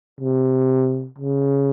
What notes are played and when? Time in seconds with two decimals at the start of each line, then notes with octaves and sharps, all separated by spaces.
0.21 C3
1.19 C#3